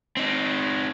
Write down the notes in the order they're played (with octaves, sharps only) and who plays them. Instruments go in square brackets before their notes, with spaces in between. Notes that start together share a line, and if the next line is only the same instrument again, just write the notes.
[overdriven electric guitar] C4 D#4